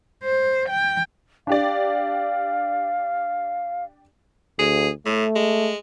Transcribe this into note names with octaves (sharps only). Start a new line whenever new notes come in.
C5
G5
D4 G4 D5 F5
D2 G#4
A2 A3
G#3